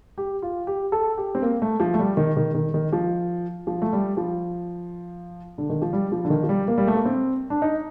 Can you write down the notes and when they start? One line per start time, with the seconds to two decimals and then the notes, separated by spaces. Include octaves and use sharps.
0.18 G4
0.42 F4
0.67 G4
0.92 A4
1.18 G4
1.35 C4
1.42 A#3
1.62 A3
1.80 F3
1.94 A3
1.99 G3
2.17 D#3
2.37 D#3
2.55 D#3
2.74 D#3
2.93 F3
3.67 F3
3.82 A3
3.93 G3
4.17 F3
5.58 D3
5.69 D#3
5.82 F3
5.93 G3
6.12 F3
6.25 D3
6.30 D#3
6.43 F3
6.49 G3
6.68 A#3
6.78 G3
6.87 A3
6.95 A#3
7.05 C4
7.50 D4
7.62 D#4